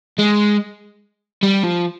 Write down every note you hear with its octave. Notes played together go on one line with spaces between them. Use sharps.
G#3
G3
F3